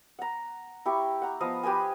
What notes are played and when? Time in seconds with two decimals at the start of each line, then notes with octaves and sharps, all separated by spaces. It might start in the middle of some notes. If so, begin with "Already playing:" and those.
0.19 F#5 A#5
0.86 E4 G4 C#6
1.22 F#5 A#5
1.40 F3 B3 D#5 F5
1.63 G4 B4 C5 G#5